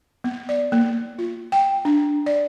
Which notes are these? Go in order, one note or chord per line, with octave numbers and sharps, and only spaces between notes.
B3
D5
A#3
F4
G5
D4
D5